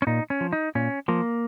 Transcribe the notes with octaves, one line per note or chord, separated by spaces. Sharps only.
C#4
A#2 D#4
C#4
F3
D#4
A#2 C#4
F3 A#3